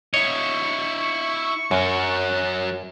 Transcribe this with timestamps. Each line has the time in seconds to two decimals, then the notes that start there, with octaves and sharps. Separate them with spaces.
0.14 E4 C#5 D#5 C#6
1.71 F#2 F#3 A#4